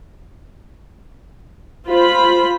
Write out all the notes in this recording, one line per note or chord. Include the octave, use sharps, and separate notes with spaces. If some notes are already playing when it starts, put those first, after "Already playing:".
F4 C5 B5